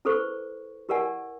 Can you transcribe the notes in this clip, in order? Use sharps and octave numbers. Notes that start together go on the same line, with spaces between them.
E4 G#4 A4 B4 C5 C#6
E4 G4 A#4 D5 F#5 G#5